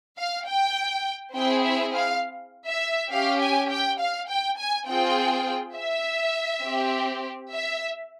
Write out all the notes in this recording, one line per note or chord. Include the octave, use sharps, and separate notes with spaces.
F5
G5
C4 E4 G#4 G5
E5
F5
E5
C#4 G4 F5
G#5
G5
F5
G5
G#5
C4 F4 G#4 G5
E5
C4 G4
E5